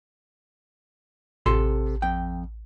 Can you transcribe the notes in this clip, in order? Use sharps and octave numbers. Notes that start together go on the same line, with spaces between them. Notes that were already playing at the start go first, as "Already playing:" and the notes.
A1 C3 A4 C6
F2 G5